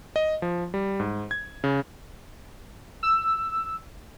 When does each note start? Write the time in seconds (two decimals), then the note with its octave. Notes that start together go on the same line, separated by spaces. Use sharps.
0.16 D#5
0.42 F3
0.74 G3
1.00 G#2
1.31 G#6
1.64 C#3
3.03 E6